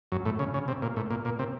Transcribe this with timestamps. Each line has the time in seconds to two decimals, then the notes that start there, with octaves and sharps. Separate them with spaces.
0.12 F#2
0.25 A2
0.39 C#3
0.54 C#3
0.68 C3
0.82 A#2
0.96 A2
1.10 A#2
1.25 A#2
1.39 C3